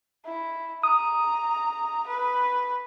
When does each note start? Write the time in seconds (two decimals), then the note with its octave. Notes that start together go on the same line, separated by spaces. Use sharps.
0.25 E4
0.83 A#5 D#6
2.07 B4